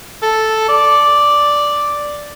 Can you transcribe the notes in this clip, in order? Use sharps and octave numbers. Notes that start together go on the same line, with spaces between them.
A4
D5